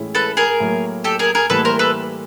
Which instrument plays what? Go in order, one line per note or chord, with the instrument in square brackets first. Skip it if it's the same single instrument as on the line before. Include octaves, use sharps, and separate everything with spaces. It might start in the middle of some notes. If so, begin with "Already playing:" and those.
Already playing: [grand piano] A2 E3 G#3 C#4 E4
[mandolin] A4 B4
G#4 A#4
[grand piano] A2 F#3 A#3
[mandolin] G4 A4
G#4 A#4
G#4 A#4
[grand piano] A2 E3 G3 A#3 [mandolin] A4 B4
[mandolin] A#4 C5
A4 B4